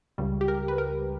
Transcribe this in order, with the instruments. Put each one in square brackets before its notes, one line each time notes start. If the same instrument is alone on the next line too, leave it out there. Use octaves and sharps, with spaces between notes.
[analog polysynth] C#2 C#3 G3
G4
A#4
B4
A#4